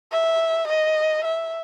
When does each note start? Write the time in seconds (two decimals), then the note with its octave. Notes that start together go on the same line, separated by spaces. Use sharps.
0.12 E5
0.68 D#5
1.25 E5